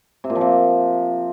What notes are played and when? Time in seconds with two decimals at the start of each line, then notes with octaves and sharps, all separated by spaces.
0.24 C3
0.30 A#2
0.35 F3
0.41 C3